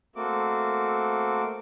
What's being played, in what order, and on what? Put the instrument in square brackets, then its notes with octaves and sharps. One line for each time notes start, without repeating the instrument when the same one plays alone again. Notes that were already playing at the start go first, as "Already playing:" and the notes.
[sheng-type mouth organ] A3 A#3 C4 F#4 D6